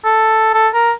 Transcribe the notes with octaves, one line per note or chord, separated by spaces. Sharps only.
A4
A4
A#4